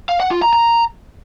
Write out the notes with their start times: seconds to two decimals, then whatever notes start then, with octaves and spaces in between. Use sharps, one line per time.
0.09 F5
0.20 F#5
0.31 F4
0.42 A#5
0.53 A#5